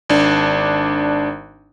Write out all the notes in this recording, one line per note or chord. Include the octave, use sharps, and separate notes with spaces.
G#1 D4